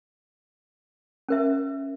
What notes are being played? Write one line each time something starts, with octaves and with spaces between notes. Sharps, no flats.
C#4 A#4 E5